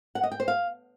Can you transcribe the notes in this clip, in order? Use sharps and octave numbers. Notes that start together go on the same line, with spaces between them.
F#5
D#5
G5
C5
F5